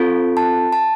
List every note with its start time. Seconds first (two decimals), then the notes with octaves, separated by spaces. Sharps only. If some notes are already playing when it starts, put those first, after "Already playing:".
Already playing: C4 F4 A4
0.37 A5
0.73 A5